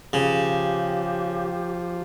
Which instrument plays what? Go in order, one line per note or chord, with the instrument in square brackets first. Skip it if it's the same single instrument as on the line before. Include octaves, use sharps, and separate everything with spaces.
[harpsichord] C#3 [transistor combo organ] F3 [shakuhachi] G4